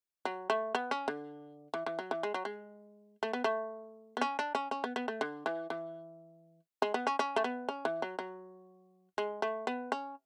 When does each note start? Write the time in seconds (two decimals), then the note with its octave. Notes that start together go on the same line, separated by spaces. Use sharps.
0.25 F#3
0.50 A3
0.75 B3
0.91 C#4
1.08 D3
1.74 E3
1.86 E3
1.99 F#3
2.11 E3
2.23 G#3
2.34 F#3
2.45 G#3
3.23 A3
3.33 B3
3.44 A3
4.17 B3
4.21 C#4
4.39 D4
4.55 C#4
4.71 C#4
4.84 B3
4.96 B3
5.08 A3
5.21 D3
5.46 E3
5.70 E3
6.82 G#3
6.94 B3
7.07 C#4
7.19 C#4
7.36 A3
7.44 B3
7.69 C#4
7.85 E3
8.02 F#3
8.19 F#3
9.18 G#3
9.42 A3
9.67 B3
9.92 C#4